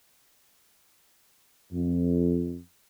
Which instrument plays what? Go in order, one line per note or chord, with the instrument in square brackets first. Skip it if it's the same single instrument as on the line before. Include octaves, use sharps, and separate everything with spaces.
[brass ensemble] F2